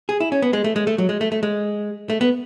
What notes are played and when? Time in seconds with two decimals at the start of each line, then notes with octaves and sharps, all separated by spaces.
0.09 G#4
0.20 E4
0.32 C#4
0.42 B3
0.53 G#3
0.64 A3
0.76 G#3
0.87 A3
0.98 F#3
1.09 G#3
1.21 A3
1.32 A3
1.43 G#3
2.10 A3
2.21 B3